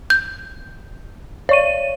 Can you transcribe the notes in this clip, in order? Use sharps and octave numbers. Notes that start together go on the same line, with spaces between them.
G6
C#5 D5 C#6 D#7